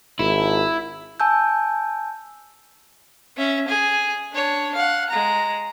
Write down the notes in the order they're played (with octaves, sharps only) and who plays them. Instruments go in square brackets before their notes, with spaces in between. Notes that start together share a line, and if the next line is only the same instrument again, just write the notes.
[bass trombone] G#1 [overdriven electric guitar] E4
[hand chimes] G#5 A5 E6 G6
[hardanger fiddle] C#4 E5
G#4 G#5
D4 C#5
F5 F#5
G#3 A#5